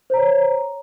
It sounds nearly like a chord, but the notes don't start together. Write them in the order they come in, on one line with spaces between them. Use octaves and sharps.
C5 A#5 C#5